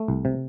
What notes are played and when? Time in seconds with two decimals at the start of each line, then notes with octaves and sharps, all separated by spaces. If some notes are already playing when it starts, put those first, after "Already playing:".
Already playing: A3
0.08 C2
0.25 C3